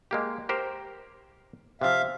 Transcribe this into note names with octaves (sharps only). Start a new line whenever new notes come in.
G#3 A#3 G4
G4 A#4 C5
C3 F3 E5 F5